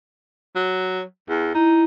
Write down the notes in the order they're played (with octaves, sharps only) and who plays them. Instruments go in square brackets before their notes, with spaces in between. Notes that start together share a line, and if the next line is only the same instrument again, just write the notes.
[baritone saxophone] F#3
E2
[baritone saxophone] D#4 [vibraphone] E4